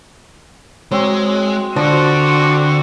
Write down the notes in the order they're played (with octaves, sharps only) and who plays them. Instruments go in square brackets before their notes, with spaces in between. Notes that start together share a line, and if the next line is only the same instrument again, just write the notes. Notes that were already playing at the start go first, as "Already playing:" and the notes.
[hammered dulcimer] F#3 C4 [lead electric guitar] G#3
[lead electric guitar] D3 [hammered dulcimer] F3 D5 A#5 [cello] F#4